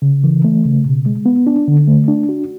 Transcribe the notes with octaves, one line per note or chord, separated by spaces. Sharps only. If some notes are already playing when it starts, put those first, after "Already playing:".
C#3
E3
A3
C#3
B2
G#3
B3
D4
D3
A3
D4
F#4